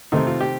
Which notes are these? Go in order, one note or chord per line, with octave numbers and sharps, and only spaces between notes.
C3 D#3 A3 C4 D#4
F4
G4